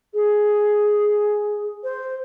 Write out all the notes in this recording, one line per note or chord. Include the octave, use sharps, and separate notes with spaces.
G#4
C5